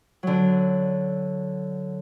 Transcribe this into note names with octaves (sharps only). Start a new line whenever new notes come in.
D3 F#3